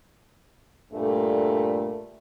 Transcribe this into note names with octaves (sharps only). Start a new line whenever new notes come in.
G2 A#2 A3